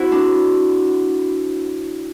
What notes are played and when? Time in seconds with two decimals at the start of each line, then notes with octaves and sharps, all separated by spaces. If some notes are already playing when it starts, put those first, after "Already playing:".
Already playing: C4 E4 F#4
0.12 D4